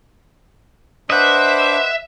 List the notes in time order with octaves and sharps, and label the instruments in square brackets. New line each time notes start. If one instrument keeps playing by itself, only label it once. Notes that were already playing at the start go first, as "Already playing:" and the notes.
[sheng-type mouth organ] D4 D6 [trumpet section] B4 C5 [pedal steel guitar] D#5 F#5 [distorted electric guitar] E5